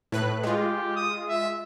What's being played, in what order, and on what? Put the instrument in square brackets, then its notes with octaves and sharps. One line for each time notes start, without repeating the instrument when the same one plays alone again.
[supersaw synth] A2 B4 F#6
[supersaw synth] G#3 F4 [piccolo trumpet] G4
[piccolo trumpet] D#6
E5